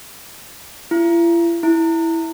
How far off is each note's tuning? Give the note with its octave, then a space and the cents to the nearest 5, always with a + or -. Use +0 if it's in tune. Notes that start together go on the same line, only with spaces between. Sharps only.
E4 +45
E4 +0